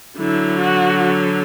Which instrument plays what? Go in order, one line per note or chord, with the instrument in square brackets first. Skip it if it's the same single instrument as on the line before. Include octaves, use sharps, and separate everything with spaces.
[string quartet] D3 F#3 [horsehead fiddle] E4
[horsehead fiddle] F#4